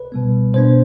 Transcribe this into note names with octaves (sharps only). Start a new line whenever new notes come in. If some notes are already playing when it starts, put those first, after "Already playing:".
Already playing: B4
B2 G3 B3
B2 B3 D4 C5